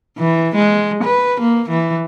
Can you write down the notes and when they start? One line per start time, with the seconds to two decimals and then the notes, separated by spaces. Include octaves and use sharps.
0.18 E3
0.55 G#3
1.03 B4
1.40 A#3
1.70 E3